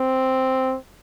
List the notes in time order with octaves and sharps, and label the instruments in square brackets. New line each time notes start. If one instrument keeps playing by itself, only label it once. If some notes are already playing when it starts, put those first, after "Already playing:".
Already playing: [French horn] C4